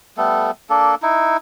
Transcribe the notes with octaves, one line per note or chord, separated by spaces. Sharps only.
G3 A3 B3 A4
A#3 D4 A4
D#4 E4